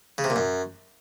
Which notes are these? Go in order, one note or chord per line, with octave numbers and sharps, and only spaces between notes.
C#3
C3
A#2
F#2